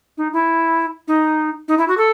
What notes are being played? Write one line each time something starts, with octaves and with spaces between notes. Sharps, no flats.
D#4
E4
D#4
D#4
E4
F#4
A4